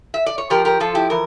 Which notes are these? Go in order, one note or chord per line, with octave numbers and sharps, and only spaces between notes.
E5
D5
C#5
F3 G4 A#4
G4 A#4
F3 F4 A4
E4 G4
E3 A#4